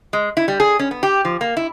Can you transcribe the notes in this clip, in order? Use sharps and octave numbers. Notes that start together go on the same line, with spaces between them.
G#3
E4
G3
G#4
C#4
B3
G4
F3
A#3
E4